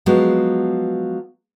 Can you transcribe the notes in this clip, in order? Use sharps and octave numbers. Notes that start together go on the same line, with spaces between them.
F3 F#3 G#3 B3